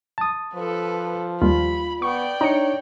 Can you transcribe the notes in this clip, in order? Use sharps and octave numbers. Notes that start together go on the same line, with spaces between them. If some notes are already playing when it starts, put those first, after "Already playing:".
A5 D#6
F3 A4 B4
D#2 G3 F4 B5
B3 D5 G5 C#6
D4 D#4 C#5 A#5 C#7